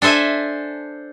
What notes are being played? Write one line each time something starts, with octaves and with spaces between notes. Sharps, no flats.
D4 A4 C5 E5 G#5